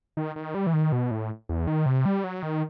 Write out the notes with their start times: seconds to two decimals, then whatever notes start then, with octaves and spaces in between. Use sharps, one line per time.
0.17 D#3
0.36 D#3
0.55 G3
0.67 E3
0.73 D#3
0.92 B2
1.11 A2
1.49 E2
1.67 D#3
1.86 C3
2.06 G3
2.24 F#3
2.43 D#3